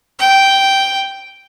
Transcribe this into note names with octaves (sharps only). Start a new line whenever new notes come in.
G5